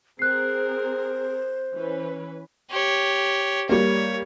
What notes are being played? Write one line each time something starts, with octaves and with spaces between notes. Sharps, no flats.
C4 G#4 A#4 C5 F#6 C7
E3 C#4 B4
G4 C#5
G3 A#3 C#5